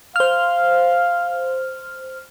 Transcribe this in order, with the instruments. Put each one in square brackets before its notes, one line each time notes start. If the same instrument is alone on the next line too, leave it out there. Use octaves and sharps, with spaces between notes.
[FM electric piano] C5 F6 [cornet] F5